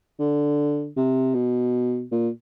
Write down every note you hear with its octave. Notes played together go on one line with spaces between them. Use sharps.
D3
C3
B2
A#2